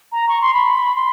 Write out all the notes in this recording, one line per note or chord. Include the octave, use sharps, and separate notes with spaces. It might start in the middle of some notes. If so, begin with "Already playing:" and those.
A#5
C#6
C6
B5
C6